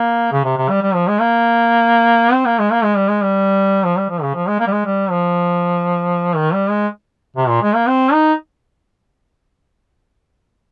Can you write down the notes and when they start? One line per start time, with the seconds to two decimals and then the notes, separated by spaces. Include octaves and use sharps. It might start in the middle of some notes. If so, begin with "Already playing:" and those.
Already playing: A#3
0.32 C#3
0.44 C3
0.57 C3
0.69 G3
0.82 G3
0.94 F3
1.08 G#3
1.19 A#3
2.32 C4
2.46 A#3
2.59 G#3
2.71 A#3
2.83 G#3
2.96 G3
3.08 G#3
3.22 G3
3.84 F3
3.97 G3
4.10 F3
4.22 C#3
4.34 F3
4.47 G#3
4.60 A#3
4.67 G3
4.72 G#3
4.85 G3
5.10 F3
6.36 D#3
6.53 G3
6.70 G#3
7.36 C3
7.49 A#2
7.62 G#3
7.74 A#3
7.87 C4
8.13 D#4